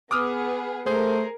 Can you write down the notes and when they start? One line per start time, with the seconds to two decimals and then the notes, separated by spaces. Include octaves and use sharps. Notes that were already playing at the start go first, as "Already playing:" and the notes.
0.11 B3 G#4 D6 D#6 F6
0.86 A3 G#4 A#4 C5